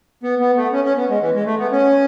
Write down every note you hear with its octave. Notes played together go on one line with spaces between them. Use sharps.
B3
B3
A3
C#4
C#4
B3
G#3
E3
G#3
A3
B3
C#4